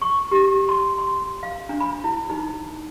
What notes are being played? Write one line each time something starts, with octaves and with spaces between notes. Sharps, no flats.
C#6
G4
C6
C6
F5
D4
B5
E4
D#4